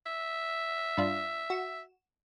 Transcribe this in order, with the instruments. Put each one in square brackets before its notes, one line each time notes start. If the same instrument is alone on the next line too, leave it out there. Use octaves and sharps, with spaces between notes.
[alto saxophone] E5
[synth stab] G2 D4 F4
F#4 E7